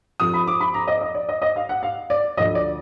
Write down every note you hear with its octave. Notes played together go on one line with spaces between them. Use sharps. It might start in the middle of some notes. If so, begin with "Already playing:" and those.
F2 F3 D#6
B5
D6
B5
A#5
D#5
D#5
D5
D#5
D#5
F5
F#5
F5
D5
D2 D3 F3 D#5
D5